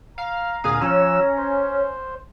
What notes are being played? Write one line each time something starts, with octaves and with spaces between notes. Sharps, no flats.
F5 A#5
D2 A#2 G#4 F5 D#6
F3 C#4 E6
C5